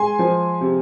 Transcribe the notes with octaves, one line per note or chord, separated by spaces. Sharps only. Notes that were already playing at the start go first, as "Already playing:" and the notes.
Already playing: G#3 G#5 C6
F3
C3